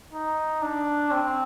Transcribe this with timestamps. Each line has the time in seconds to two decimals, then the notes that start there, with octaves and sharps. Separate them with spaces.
0.13 D#4
0.62 D4
1.11 C4